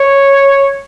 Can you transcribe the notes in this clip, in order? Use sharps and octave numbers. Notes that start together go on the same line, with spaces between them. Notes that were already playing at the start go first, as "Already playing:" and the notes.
Already playing: C#5